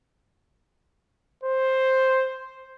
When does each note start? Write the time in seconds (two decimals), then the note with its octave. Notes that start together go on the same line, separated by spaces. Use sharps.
1.44 C5